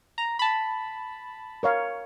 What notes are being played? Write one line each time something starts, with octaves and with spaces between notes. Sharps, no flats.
A#5
A5 B5
A#4 C#5 F5